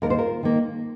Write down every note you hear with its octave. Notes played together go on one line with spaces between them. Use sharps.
D#2 A#4
C5
F4 A#4
D#3 A#3